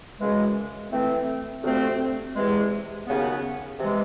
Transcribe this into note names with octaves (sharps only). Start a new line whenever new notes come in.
F#2 C#3 E3 G#3
E3 A3 C4
D2 C3 F3 A3 C4
E2 C3 E3 G#3
D#2 C#3 F#3 B3
C3 E3 G#3